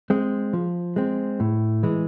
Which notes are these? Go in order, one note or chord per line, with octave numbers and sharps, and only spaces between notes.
G#3 C4
F3
G#3 C4
A2
E3 G#3